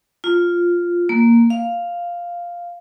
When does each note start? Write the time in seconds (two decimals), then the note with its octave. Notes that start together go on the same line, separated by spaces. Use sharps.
0.24 F4
1.09 A#3
1.50 F5